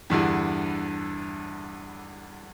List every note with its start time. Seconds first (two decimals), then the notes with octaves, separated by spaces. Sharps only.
0.10 E2 G2 D3 E3